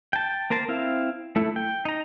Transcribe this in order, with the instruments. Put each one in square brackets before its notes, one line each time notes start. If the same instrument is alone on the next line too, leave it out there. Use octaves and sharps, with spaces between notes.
[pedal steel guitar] G5 A5
A#3 A#4 C5 A5
C4 E4 F5
A3 E4
G5
D#4 A#5